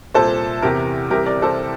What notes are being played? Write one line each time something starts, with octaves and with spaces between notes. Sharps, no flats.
C2 A#2 A4 C5
E2 C3 E3 G4 A#4
C2 C3 E3 G4 A#4
A#4 D5
A4 C5